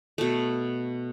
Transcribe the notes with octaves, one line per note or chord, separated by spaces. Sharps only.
B2 A3